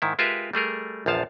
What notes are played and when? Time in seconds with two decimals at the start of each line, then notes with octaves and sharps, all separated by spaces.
0.02 G#2 D#3 E4
0.19 G#3 F4 G4 A#4 B4 E5
0.53 G3 A3 G#4 A#4
1.06 A#1 E2 F3 F5 A5